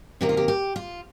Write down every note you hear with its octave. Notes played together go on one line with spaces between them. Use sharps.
C3 D#3 A#3 G4
F4
G4
G4
F4